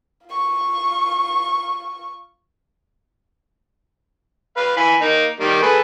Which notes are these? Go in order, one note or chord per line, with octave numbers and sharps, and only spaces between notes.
F4 C#6
B4 F5
E3 G#5 B5
A#3 D#4
D#3 G3 A#3
G#4 A4 B4